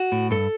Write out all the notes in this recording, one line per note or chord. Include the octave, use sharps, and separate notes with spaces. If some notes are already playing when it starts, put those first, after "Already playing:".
Already playing: F#4
A2
G2 A4